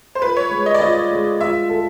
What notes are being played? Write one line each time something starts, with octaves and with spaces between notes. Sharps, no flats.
C5
F4 B4
C#5
G#3
D#5
D5
F4 D#5
G#3
F4 E5
A4